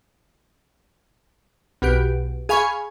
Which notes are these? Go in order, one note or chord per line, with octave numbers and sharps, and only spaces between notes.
B1 B2 G4 D7
G#4 F5 G#5 B5 C#6